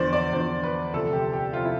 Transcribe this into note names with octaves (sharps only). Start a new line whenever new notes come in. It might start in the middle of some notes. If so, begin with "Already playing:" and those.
Already playing: E2 D3 F3 C5 D5
D5
E2 D3 F3 C5
B4
D2 C3 F3 A4
G4
G4
C3 F3 F4
E4